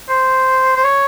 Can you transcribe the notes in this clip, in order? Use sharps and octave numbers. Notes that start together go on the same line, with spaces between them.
C5
C5
C#5